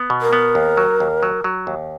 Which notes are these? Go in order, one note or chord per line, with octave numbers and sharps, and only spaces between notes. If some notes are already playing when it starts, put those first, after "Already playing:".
Already playing: B3
B2
A#4
B3
D#2
F#3
D#2
F#3
F#3
D#2